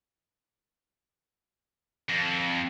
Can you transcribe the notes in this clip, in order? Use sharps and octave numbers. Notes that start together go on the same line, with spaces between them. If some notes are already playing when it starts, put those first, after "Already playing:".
F2